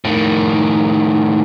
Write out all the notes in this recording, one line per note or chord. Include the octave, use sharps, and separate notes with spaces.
A2 D#3